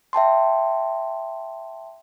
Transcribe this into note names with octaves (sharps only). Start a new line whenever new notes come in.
E5 G5 A5 C6